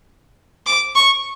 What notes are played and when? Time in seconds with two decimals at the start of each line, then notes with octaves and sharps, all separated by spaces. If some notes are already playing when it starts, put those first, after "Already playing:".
0.66 D6
0.95 C#6